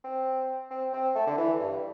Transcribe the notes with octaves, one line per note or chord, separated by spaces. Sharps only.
C4
C4
C4
A3
D3
E3
G2